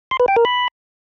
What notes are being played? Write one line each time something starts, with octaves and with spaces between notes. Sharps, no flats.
C6
B4
G5
A#4
B5